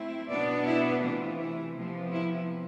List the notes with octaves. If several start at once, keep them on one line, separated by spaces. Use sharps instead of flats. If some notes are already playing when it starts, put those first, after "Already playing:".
Already playing: A3 C4 E4
B2 B3 D4 D5
E4
C3 E3 A3 F4
E4
C3 F3 B3
E4